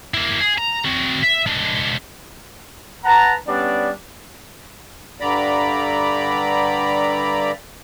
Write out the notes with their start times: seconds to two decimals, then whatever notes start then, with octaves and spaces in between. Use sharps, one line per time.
0.14 A#3 E4
0.40 G#4
0.58 A#5
0.84 C4 F#4
1.23 E5
1.47 G#3 D4
3.04 B4 F#5 A5 A#5
3.47 G3 B3 C#4 D4 D5
5.20 G2 D3 D5 A#5 B5